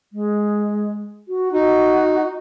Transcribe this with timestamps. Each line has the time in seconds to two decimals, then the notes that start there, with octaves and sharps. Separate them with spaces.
0.13 G#3
1.28 F#4
1.52 D#4 F#4